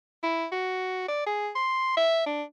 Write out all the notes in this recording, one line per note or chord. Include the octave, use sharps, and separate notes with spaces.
E4
F#4
D5
G#4
C6
E5
D4